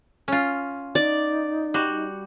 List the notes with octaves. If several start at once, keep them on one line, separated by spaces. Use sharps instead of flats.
C#4 F4
D#4 D5
G3 F#4